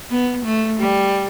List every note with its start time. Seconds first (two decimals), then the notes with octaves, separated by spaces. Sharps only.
0.10 B3
0.45 A3
0.80 G3